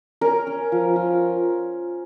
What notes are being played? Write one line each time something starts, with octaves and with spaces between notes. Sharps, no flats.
C#4 A#4
C#4
F3
F4